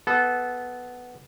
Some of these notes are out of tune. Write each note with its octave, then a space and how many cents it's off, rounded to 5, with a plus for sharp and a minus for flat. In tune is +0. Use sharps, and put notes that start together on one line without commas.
B3 +0 A4 -20